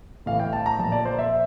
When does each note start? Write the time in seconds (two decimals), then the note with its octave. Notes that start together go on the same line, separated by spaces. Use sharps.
0.26 A2 E3 F5
0.39 G5
0.53 A5
0.66 A#5
0.79 A#2 F3 A5
0.92 D5
1.05 C5
1.19 E5